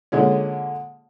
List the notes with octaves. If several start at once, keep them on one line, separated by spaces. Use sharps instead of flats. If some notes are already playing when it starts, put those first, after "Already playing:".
A#2 D3 G#3 C#4